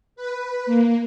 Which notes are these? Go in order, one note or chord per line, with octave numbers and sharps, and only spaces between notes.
B4
A#3